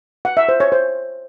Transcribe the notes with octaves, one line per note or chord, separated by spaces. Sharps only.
F#5
E5
C5
C#5
C5